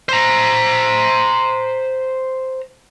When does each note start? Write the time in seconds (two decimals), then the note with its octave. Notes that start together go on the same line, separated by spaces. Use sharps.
0.09 C5 A#5